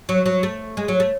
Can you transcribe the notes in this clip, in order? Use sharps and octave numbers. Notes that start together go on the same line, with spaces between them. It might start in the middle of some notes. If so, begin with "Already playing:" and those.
F#3
F#3
A3
G#3
F#3
A3